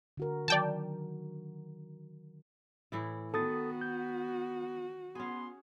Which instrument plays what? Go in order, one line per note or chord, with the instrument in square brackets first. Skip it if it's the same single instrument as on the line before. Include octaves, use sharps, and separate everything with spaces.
[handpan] D3 F#4 A#4
[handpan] D#3 F#3 [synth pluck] D5 G5 A5
[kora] A2 E3 E4
[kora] D#3 [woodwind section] B3 [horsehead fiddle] F#4 [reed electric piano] A4 D#6 A6
[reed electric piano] G6
[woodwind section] B3 C6 [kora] C#4 G#4